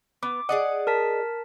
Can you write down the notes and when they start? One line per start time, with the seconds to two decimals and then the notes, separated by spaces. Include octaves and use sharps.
0.23 B3 D6
0.49 G#4 D5 D#5 F#5
0.87 A#4 A5 B6